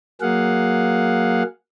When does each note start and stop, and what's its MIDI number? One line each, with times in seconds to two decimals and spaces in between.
0.21 1.43 54
0.21 1.43 58
0.21 1.43 68
0.21 1.43 77
0.21 1.43 78